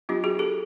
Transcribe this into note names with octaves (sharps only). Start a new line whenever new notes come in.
F#3 B3 D4 F4 G4
F#4 G#4
G4 A4